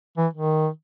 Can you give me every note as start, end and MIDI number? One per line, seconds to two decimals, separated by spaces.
0.17 0.27 52
0.34 0.68 51